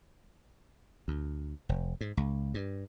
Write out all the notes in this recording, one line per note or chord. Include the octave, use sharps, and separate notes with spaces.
D2
F1
G#2
C#2
G2